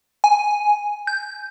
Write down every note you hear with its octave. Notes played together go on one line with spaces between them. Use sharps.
G#5
G6